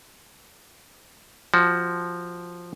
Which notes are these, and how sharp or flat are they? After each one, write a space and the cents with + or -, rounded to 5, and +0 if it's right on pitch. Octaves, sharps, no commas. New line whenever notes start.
F3 +0 F#4 +15